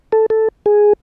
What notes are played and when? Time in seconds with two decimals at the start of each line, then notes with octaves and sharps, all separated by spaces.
0.12 A4
0.30 A4
0.66 G#4